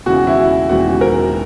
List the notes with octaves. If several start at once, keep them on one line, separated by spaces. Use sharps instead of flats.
E1 D#2 C#3 E3 F#4
E4
E1 D#2 C#3 E3 F#4
A#4